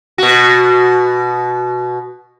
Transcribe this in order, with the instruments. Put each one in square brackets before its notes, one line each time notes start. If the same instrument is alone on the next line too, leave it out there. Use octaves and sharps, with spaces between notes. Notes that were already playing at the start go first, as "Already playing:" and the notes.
[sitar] B2 F#4